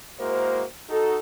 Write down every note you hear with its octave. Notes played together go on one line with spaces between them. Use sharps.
G#3 A#3 E4 F#4 A#4 C5
D#4 F#4 A4